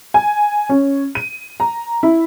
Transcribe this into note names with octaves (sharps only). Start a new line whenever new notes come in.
G#5
C#4
D#7
A#5
E4